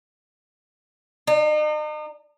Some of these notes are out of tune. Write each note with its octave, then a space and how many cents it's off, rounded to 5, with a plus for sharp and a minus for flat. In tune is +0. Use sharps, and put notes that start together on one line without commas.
D#4 -40